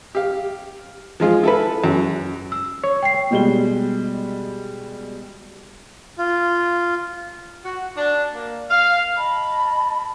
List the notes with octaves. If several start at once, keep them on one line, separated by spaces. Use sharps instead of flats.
G4 F5
F3 G#3 F4
E4 A4 B4
F#2
E6
C#5
G5 C7
B2 G3 G#3 G7
F4
F#4
D4
A#3
F5
D#5 A5 B5